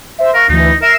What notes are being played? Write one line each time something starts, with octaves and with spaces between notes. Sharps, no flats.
C5 E5
A#4 F5 C#6 F#6
D2 E3 D#4
A#4 E5 C7 E7